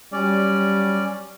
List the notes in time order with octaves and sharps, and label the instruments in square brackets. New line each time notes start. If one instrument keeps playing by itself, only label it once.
[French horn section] F#3 G3 [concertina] C#4 D5